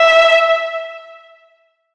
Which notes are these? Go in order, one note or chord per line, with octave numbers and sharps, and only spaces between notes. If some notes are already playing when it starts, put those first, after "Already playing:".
Already playing: E5